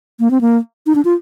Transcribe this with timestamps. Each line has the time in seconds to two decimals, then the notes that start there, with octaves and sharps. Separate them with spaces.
0.20 A#3
0.31 C4
0.41 A#3
0.87 D#4
0.95 D4
1.05 F4